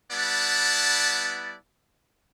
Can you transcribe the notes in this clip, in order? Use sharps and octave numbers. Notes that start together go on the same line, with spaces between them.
G3 B3 E4 D5 F#5 A5